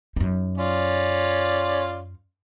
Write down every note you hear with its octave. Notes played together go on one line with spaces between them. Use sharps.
F#2 D#4
C#4 F4 D5